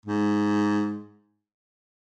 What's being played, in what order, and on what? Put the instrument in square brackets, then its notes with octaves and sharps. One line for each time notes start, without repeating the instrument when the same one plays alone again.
[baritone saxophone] G#2